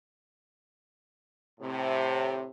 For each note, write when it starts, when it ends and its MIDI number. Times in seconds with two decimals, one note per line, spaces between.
1.60 2.51 45
1.60 2.51 48